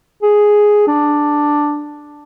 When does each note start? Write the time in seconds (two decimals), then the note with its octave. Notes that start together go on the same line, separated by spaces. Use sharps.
0.23 G#4
0.88 D4